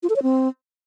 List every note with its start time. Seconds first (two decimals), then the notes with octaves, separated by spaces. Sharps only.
0.03 F4
0.10 A4
0.16 C#5
0.23 C4